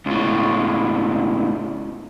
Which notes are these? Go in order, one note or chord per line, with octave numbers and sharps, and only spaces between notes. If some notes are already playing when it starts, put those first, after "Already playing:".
C#2 A2